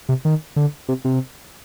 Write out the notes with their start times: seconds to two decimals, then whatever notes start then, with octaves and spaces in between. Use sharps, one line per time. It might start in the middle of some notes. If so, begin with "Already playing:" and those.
0.09 C3
0.25 D#3
0.56 D3
0.88 C3
1.05 C3